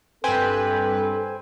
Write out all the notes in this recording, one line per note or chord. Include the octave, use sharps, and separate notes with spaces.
G2 C4 A4 B4 C5 G5 G#5